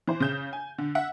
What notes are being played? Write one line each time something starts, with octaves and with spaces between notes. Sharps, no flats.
E3 C5
C#3 G6 E7
G#5
D3
E5 F#5